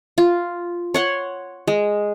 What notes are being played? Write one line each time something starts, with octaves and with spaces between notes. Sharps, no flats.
F4
C#5 F#5 C6
G#3